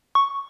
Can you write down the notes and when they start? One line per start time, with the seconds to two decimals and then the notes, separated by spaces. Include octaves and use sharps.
0.15 C#6